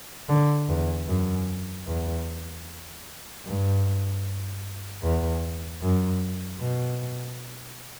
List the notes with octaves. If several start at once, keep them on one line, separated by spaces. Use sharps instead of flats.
D3
E2
F#2
E2
G2
E2
F#2
B2